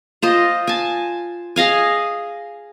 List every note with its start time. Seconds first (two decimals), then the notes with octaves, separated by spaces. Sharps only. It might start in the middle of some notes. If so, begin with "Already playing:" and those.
0.22 F4 C5 D#5
0.67 G#5 A5
1.56 G#4 D#5 F5 G#5